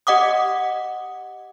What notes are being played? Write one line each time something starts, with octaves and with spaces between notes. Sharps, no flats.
G4 D#5 F#5 D6 D#6